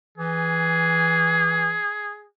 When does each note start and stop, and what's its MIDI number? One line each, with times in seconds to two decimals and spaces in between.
0.18 1.77 52
0.18 2.26 68